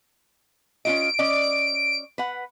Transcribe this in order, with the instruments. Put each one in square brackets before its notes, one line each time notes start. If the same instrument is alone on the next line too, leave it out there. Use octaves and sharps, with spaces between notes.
[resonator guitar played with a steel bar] C#4 F4 D#5 [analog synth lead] D7
[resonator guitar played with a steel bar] C#4 D5 D#5
B4 F#5